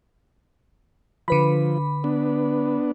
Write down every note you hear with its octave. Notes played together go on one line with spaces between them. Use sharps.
D3 F3 B4 B5
B3 D4